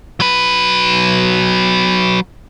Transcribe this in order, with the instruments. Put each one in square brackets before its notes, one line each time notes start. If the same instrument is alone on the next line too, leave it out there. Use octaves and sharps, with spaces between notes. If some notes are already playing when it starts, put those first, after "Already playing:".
[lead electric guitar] F#3 B4